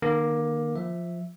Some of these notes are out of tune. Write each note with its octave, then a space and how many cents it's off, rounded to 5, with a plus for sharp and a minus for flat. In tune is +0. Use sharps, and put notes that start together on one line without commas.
D#3 -35 A#3 +20 A4 +0
F3 +0 E5 +0